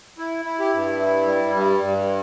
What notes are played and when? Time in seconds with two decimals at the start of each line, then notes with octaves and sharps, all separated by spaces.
0.18 E4
0.45 E4
0.59 G4
0.73 G2
1.00 E4
1.27 G3
1.54 G2
1.82 G2